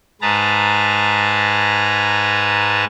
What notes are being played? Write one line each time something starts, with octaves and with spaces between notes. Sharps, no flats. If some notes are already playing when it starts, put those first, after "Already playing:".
G#2 G#4 B4 A5 A#5